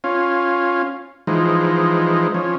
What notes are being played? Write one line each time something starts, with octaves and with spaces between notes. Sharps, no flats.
C#4 F4
E3 F3 G#3 D#4
F3 C#4